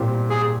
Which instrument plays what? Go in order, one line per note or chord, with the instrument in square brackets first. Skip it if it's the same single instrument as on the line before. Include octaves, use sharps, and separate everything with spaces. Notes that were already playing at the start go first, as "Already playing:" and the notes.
Already playing: [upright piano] A#2 G3 C4 G4
[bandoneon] G#4